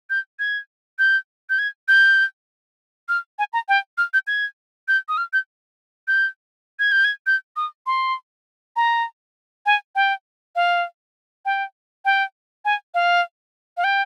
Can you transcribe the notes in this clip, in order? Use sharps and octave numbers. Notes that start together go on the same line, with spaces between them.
G6
G#6
G6
G6
G#6
G6
F6
G#5
A#5
G5
F6
G6
G#6
G6
D#6
F6
G6
G6
G#6
G6
G#6
G6
D#6
C6
A#5
G#5
G5
F5
G5
G5
G#5
F5
F5
G5